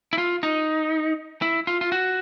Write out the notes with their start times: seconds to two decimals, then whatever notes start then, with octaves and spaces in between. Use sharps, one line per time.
0.13 E4
0.18 F4
0.43 D#4
1.42 E4
1.67 F4
1.81 F4
1.92 F#4